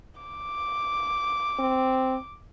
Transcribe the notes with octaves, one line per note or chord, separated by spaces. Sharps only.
D6
C4